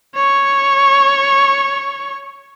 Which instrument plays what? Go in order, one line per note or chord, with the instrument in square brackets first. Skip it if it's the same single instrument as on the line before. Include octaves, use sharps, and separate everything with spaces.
[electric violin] C#5 C#6